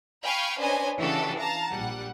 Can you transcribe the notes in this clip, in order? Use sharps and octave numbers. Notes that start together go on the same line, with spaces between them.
F5 G5 G#5 B5 C#6 F6
C#4 D4 B4 C5 D#5 G#5
C#3 E3 D4 F#4 G4 A4
F5 A5 A#5
A#1 G3 F#5